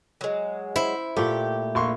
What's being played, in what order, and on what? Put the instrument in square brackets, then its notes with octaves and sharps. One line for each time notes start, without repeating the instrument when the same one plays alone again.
[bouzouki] F#3 G#3
[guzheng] E4 [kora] C5
[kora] A#2 A3 [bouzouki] G4
[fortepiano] A#1 C6 C#6